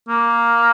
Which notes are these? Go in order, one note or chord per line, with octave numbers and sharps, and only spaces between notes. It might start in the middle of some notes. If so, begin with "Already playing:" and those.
A#3